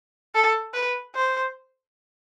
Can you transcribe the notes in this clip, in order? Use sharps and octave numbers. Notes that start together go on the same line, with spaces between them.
A4
B4
C5